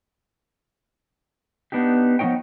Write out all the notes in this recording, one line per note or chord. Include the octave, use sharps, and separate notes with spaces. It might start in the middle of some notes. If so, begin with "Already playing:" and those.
B3 D4 D#4 G4
F3 B3 C#4 D#4 C#5 G5